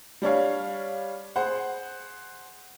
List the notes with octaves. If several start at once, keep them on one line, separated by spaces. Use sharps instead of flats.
G3 D4 C#5 F5
G#4 C5 F#5